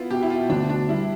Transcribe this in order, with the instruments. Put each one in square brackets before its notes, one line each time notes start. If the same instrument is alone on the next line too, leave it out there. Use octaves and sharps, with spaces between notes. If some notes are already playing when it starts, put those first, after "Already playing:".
Already playing: [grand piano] B3 [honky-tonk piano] E4 F4
[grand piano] B2 [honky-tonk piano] G4
[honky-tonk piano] E4
F4
[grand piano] D2 [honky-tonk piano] D4
[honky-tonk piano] D4
[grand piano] G3 [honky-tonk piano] E4